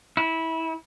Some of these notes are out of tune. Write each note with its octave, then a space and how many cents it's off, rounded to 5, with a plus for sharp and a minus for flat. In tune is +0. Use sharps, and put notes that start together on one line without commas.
E4 -20